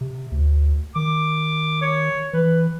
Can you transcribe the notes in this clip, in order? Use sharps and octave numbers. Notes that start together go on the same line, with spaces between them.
C3
D2
D#3 D6
C#5
E3 B4